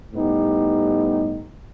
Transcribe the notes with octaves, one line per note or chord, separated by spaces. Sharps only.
A2 G3 B3 D#4 G4